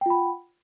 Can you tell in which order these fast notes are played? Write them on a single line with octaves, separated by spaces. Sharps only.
G5 F4 B5 F#5